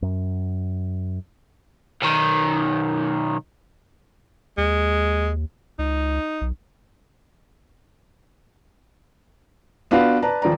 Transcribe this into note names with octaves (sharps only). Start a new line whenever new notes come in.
F#2
B1 D#3
D#2 G#3
C#2 D#4
B1
B3 D4 F4 F#4 B4 F5
B4 D5 A5 A#5
D#1 F3 D5 A#5